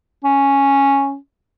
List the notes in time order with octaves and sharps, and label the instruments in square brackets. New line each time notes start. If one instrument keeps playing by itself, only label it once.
[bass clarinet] C#4